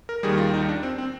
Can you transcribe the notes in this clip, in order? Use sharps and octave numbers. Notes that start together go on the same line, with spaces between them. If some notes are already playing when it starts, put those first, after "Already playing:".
A#4
D#2 D#3 G3 G#4
F4
D#4
D4
C4
C4